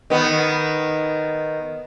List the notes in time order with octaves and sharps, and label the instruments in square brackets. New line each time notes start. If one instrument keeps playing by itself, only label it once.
[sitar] D#3 B3